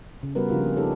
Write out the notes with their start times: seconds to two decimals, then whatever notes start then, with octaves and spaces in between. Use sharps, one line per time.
0.23 C#3
0.35 G3 B3 F#4 A#4 B4
0.49 C#3 F3 D4 F4 G4 A#4
0.60 A#3 G#4
0.76 D#4 G4 A4 B4 C#5